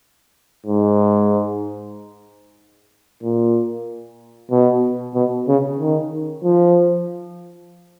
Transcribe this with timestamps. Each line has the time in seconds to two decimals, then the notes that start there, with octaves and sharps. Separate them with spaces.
0.66 G#2
3.23 A#2
4.51 B2
5.15 B2
5.48 C#3
5.79 D#3
6.43 F3